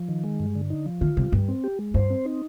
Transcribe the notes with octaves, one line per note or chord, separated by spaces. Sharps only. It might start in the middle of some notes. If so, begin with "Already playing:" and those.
Already playing: F3
D#3
G#3
G2
D3
D#4
F3
D#3 F4
C3 G3
G2 G3
C4
G4
G#3
G2 C5
C4
D#4